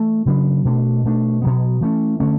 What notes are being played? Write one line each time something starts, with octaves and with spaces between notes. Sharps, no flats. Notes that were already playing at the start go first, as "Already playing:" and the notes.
Already playing: E3 A3
C#3 F#3 B3 D4
B2 A3 D4
B2 A3 D4
B2 F#3 B3
E3 A3 C#4
D3 A3 C#4